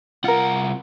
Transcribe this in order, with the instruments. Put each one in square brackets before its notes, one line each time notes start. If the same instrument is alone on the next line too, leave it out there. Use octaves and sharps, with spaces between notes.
[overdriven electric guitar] C2 F#5 [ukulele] F4 A#4